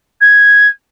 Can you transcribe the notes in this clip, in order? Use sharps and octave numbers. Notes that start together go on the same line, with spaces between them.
G#6